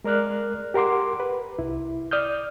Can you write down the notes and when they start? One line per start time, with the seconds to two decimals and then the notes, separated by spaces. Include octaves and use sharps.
0.04 G#3 A#4 D5 F6 F#6
0.74 G4 A#4 F#5 C6 D6
1.20 B4
1.59 C2 E4
2.11 D5 D#6 F6 G6